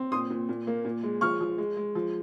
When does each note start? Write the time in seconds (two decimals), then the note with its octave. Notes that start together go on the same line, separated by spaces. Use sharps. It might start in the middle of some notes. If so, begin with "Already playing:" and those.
Already playing: C4
0.12 A#2 C6 D#6
0.30 A#2
0.49 A#2
0.67 A#3
0.85 A#2
1.03 G#3
1.21 F3 C#6 F6
1.41 F3
1.58 G#3
1.77 G#3
1.95 F3